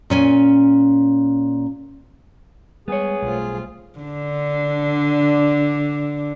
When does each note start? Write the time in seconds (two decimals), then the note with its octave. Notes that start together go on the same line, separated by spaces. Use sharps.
0.10 A#2 C#4 G#5
2.88 G3 G#3 B3 G#4 C#5
3.22 B1 G3 A3 C4 F4
3.99 D3 D4